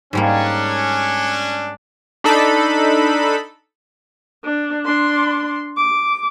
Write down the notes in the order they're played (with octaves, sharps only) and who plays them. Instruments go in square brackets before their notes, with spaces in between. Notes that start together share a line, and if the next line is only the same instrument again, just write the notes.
[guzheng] G#2 G3 A#3 [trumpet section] C#4 D4
[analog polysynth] D4 D#4 A4 B5
[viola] D4
D4 C6
D6